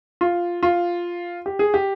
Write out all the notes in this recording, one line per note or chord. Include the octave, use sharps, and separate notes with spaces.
F4
F4
G4
G#4
G4